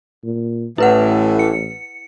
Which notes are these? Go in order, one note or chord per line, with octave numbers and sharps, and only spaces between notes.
A#2
A1 A2 E3 E4 B4 F#5
C#7